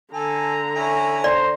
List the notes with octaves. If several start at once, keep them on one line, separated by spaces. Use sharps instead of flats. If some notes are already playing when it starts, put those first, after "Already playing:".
D3 A4 G#5 A#5
C#4 E4 G#5
C5 D5